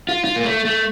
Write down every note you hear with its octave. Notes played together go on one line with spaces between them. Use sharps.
F4
F4
A#3
A3
A3